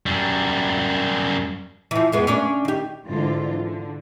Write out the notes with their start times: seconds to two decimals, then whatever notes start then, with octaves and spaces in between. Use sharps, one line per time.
0.06 F#2 G3
1.91 E3 F3
2.12 F2 G#3 B3
2.27 C#4 D4 D5
2.65 D#3 G4
3.07 G#2 D3 E3 F4
3.62 D3